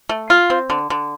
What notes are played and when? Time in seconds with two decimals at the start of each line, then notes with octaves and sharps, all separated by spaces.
0.09 A3
0.30 F4
0.50 C4
0.70 D3
0.90 D3